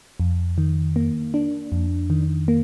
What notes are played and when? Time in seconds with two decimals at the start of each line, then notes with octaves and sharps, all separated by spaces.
0.20 F2
0.58 D#3
0.96 A#3
1.34 D4
1.72 F2
2.10 D#3
2.48 A#3